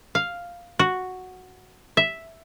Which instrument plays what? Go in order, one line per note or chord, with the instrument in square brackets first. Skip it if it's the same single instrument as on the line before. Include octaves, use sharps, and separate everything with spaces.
[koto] F5
F#4
E5